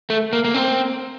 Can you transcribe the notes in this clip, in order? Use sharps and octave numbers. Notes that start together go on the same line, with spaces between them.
A3
A#3
A#3
C4